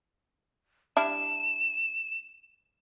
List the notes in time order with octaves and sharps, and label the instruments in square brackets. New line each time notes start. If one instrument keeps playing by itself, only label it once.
[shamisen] G3 D4 E4 [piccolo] E7